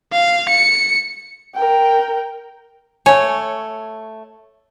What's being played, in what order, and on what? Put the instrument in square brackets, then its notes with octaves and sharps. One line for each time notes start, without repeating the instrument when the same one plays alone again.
[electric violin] F5
C#7
[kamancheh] A#4 G5
[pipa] A3 G#5 [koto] C#5